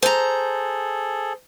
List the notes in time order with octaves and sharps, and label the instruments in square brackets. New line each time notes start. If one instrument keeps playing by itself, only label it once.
[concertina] G#4 A4 [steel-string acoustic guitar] C5 A#5